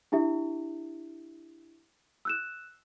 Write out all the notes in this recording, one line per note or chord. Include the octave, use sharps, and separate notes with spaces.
D4 E4 G4 E5
E6 F#6 E7